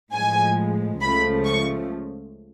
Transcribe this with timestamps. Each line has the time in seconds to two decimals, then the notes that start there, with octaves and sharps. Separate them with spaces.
0.13 A2 F3 G#3 G#5
1.01 C#2 C#3 F3 A3 B5
1.45 C#6